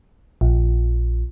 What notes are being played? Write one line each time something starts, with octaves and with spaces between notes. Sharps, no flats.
A#1